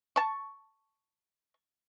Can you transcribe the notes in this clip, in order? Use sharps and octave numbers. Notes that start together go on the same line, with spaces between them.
A5 C#6